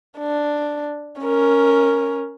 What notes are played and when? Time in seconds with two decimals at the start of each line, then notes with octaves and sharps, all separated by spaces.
0.18 D4
1.22 C#4 A#4